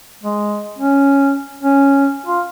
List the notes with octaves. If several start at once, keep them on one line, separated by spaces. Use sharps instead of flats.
G#3
C#4
C#4
F4